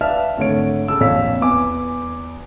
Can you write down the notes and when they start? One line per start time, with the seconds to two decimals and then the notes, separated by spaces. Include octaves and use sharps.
0.01 B4 D5 E5 F5 A5 F6
0.37 G#1 D3 A3 C#5 D7
0.88 C#3 A4 E6
1.00 A#1 F2 C#5 F5 E6 B6
1.41 E2 B3 G#5 D6